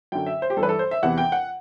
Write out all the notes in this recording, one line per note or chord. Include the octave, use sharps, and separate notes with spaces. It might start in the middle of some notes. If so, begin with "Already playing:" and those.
F#2 D3 G5
E5
C5
G4
G2 E3 A4 B4
A4
C5
E5
E2 C3 E3 F#5
G5
F#5